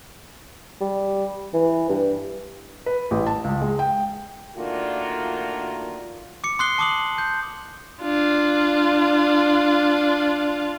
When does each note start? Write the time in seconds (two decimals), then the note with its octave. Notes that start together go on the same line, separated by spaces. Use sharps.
0.81 G3
1.53 E3
1.89 G2
2.86 B4
3.11 A1
3.27 A5
3.44 C#2
3.61 G#3
3.79 G5
4.56 D#3 A3 A#3 D4 F4 F#4
6.44 D6 C#7
6.59 C6 D#6 F#6 C7 G7
6.78 A5 D6 D#6 F#7
7.18 G6
8.02 D4 F4